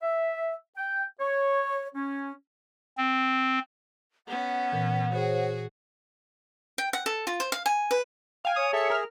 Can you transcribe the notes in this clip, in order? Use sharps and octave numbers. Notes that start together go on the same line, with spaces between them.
E5
G5
C#5
C#4
C4
B3 C#4 F#5
A#2 E3
F#4 G#4 C5 C#5
G5
F#5
A4
F4
C5
F5
G#5
B4
F5 G5 G#5
C#5 D#6
G#4 A4 E5 C#7
A#4 F6